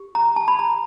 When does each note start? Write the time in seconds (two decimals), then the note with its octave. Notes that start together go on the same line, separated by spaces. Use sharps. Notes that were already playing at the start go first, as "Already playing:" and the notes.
Already playing: G4
0.15 A#5
0.36 A5
0.48 B5
0.59 A#5